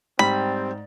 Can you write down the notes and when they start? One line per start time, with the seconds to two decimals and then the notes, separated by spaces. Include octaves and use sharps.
0.19 G#2 G3 C4 B5